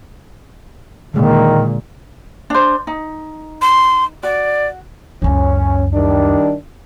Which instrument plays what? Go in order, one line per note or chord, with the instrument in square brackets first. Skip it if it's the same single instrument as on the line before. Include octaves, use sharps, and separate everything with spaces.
[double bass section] A#2 [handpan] D3 G#3 [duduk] D#3
[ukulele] D4 C5
D#4
[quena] C6
[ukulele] F#4 [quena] D5
[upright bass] C#2 F#2 [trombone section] C#4
[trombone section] D#3 G3 D4